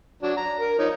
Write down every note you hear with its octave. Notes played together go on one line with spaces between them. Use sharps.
F#3 D4
A#5
A#4
F3 D#4 C#5